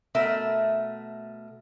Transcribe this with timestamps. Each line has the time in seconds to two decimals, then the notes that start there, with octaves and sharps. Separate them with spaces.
0.15 B2 A3 A#4 E5